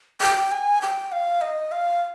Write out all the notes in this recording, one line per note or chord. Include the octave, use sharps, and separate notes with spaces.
G5
G#5
G5
F5
D#5
F5